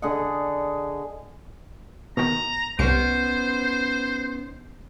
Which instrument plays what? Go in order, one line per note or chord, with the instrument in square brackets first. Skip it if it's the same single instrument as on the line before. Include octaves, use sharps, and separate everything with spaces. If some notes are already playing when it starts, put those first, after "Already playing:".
[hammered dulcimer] D3 G#4 D#5 F#5
[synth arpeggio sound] B2 D#3 [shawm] A#5
[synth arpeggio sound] C2 C#7 [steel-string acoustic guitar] B3 C#4 D#4 [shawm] C5